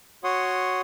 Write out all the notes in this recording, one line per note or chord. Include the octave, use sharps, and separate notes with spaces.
F#4 C#5 F#5 C6 D#6